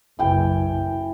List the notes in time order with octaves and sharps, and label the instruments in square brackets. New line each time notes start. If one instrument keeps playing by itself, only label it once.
[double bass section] F#1 [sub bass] B1 [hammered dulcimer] E3 G5 G#5